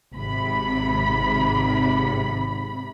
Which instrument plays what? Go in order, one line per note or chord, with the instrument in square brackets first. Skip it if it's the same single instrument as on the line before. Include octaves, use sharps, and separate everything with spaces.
[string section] G#1 C3 B5